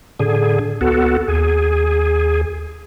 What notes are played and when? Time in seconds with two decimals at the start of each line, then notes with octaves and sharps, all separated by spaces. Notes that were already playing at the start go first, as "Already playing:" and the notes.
0.20 A2 D3 G#4
0.81 C#2 B3 F#4 A4
1.28 D#2 G#4